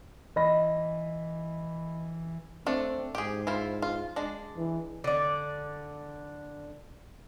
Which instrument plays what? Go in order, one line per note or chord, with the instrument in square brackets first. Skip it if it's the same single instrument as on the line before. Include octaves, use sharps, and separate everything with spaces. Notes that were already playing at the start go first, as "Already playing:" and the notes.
[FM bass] E3 [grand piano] D#5 B5 A#6
[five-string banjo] A3 D4 [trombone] C4
[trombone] G#2 [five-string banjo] G4 G#4
[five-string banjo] E4 F4 C5
F4
G#3 D4
[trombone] E3
[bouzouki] D3 D5